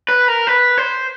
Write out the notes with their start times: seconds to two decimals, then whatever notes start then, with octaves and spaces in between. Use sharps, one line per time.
0.09 B4
0.28 A#4
0.47 B4
0.78 C5